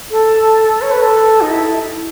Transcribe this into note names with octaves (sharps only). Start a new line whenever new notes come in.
A4
C#5
B4
A4
D#4
E4